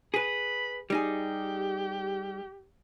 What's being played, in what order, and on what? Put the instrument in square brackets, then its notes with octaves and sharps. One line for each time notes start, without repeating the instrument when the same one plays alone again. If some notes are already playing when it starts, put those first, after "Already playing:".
[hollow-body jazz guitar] G#4 B4 [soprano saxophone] B5
[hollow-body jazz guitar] G3 D#4 G#4 [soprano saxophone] G4